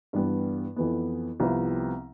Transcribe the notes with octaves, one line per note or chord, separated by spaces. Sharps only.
G2 E3 G3 B3
F2 E3 B3
C2 C3 F3 B3 E4